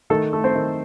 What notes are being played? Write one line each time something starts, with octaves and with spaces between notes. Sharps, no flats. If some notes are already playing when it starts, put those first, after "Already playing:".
D#3 A3 A4
A3
C4 C5
D#3